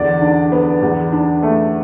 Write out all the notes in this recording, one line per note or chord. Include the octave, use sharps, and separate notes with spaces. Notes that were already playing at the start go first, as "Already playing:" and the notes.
Already playing: E2 D3 D5
D4
B3
E2
D4
A3